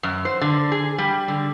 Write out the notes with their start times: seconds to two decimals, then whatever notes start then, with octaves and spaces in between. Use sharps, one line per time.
0.03 F#2
0.25 C5
0.41 D3
0.72 G#4
0.98 G3
1.28 D3